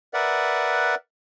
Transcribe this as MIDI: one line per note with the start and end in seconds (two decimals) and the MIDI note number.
0.14 0.95 70
0.14 0.95 71
0.14 0.95 74
0.14 0.95 76
0.14 0.95 78